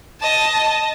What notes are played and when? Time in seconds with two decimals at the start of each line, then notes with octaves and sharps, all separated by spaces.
0.21 D#5 A5